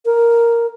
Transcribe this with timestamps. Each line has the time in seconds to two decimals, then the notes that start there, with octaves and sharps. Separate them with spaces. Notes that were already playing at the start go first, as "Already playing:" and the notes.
0.06 A#4